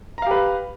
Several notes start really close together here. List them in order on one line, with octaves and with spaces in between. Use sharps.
A#5 F5 G4 B4